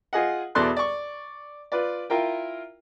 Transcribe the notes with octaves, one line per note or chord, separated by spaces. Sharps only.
F4 G#4 D#5 F#5
E2 B2 A4 D5 C6 F#6
D5 C#6
F4 B4 D5
E4 F4 A#4 G5